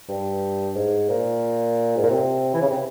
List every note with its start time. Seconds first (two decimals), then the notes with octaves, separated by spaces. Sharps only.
0.09 G2
0.75 G#2
1.09 A#2
1.96 G#2
2.03 A#2
2.10 C3
2.54 E3
2.62 C#3
2.69 C3